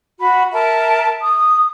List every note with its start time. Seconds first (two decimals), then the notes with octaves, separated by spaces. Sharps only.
0.20 F#4 B5
0.52 A#4 E5 A5
1.22 D#6